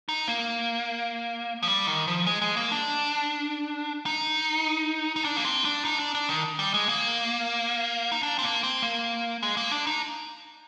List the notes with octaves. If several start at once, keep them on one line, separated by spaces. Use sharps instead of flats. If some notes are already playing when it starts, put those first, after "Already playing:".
D#4
A#3
F3
G3
D#3
F3
G#3
G#3
A#3
D4
D#4
D#4
D4
A#3
C4
D4
D#4
D4
D4
D#3
G3
G#3
A#3
D#4
D4
C4
A#3
C4
A#3
G#3
A#3
D4
D#4